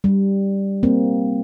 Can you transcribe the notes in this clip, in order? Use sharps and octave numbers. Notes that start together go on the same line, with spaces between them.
G3
A#3 C4